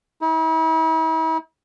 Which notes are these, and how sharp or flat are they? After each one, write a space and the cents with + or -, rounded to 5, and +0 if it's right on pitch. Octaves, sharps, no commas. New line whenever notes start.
E4 -45